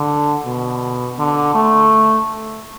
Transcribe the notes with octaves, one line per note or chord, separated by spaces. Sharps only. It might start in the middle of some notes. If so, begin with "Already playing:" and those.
Already playing: D3
B2
D3
A3